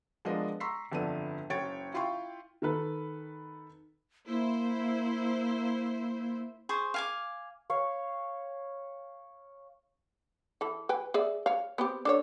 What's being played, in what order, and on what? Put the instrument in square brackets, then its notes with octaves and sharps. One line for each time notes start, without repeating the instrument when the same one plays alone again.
[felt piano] F3 G#3 B3 D4 A#4 D#5
A#5 C6 C#6 E6 B6 C7
G1 F2 B3 A4 D5 D#7
F#1 C#5 G5 A6 D7
E4 F4 F5 G5 C6 C#6
D#3 A4 B4
[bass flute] A#3 [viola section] E4 C5
[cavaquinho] G#4 C5 C#6
F5 G#5 D6
[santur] C#5 F5
[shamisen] E3 A4
B4 G5 G#5
G#4 D5 E5
C#5 F5
B3 C4 G4
D4 A4 C#5